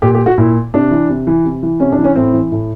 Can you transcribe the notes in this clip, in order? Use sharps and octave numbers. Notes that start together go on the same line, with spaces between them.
A#2 G4
G4
F#4
A#2 E4
C3 D4
E3
C3
E3
C3
E3
C3 C#4
D4
E3
C#4
A2 C4
E3
A2